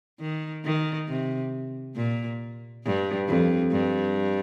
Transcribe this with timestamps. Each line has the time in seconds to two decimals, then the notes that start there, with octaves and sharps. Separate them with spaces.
0.20 D#3
0.64 D#3
1.08 C3
1.96 A#2
2.84 G2
3.28 F2
3.71 G2